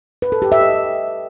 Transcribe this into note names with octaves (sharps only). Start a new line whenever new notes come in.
B4
A4
G4
E5
D#5